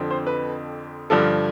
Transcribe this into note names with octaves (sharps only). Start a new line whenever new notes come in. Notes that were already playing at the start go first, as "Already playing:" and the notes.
Already playing: F2 D3 F3 C4
C5
B4
G2 D3 F3 A4